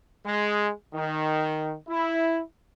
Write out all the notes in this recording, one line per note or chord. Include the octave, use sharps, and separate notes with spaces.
G#3
D#3
E4